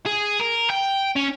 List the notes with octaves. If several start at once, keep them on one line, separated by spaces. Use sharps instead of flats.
G#4
A#4
G5
C#4